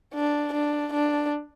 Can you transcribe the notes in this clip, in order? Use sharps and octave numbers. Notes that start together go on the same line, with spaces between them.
D4
D4
D4